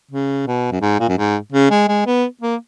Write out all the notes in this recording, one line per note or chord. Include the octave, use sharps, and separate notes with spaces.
C#3
B2
F#2
G#2
A#2
F#2
G#2
C#3
G#3
G#3
B3
A#3